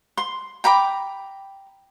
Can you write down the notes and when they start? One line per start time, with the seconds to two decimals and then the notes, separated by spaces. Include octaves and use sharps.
0.17 C6
0.64 G5 A#5 B5 D6